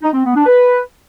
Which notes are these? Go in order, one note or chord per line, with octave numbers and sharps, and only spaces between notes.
D#4
C4
B3
D4
B4